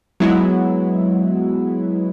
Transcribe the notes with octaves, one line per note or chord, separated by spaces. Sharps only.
F#3 G#3 B3 E4